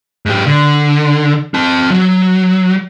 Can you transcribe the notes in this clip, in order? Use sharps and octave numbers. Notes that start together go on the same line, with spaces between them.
G#2 G4
D3
C4 A5
F#3